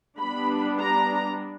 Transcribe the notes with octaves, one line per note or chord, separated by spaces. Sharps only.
G3 B3 D4 B5
A#5